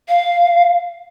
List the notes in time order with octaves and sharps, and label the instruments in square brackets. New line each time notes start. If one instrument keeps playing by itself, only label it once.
[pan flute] F5